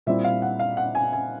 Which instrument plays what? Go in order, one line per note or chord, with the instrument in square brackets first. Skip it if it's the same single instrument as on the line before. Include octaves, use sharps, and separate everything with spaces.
[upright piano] A#2 G3 C4 E4 E5
F5
F#5
F5
F#5
G#5
G#5